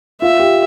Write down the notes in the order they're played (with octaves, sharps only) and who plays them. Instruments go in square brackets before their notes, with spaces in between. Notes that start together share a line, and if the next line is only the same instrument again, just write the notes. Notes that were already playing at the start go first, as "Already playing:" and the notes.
[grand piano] F4 [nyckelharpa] E5
[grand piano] G4